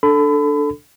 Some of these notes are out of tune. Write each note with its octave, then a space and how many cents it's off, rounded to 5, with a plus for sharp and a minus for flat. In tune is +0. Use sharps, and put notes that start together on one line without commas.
D4 +0 A4 +0 B5 +30